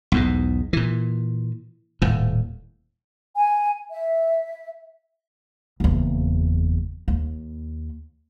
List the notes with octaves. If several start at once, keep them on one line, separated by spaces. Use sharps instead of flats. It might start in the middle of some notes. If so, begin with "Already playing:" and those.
B1 E2 G#2
A#2 E3
D#1 A2
G#5
E5
F#1 E2
D#2